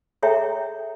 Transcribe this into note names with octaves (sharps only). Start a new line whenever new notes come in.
G#4 A4 C#5 E5 G5 A#5